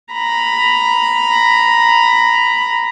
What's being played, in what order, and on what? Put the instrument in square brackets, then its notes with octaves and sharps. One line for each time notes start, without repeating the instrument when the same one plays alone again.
[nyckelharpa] A#5 B5